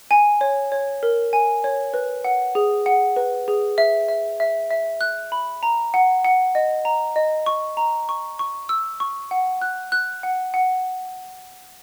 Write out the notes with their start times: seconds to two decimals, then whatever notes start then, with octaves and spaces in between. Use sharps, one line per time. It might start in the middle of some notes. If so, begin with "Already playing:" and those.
0.11 G#5
0.41 C#5
0.72 C#5
1.03 A#4
1.33 G#5
1.64 C#5
1.94 B4
2.24 F#5
2.55 G#4
2.86 F#5
3.16 B4
3.48 G#4
3.78 E5
4.09 E5
4.40 E5
4.71 E5
5.01 F#6
5.32 B5
5.63 A#5
5.94 F#5
6.24 F#5
6.55 D#5
6.85 A#5
7.16 D#5
7.46 C#6
7.77 A#5
8.09 C#6
8.39 C#6
8.69 E6
9.00 C#6
9.31 F#5
9.62 F#6
9.92 F#6
10.23 F#5
10.54 F#5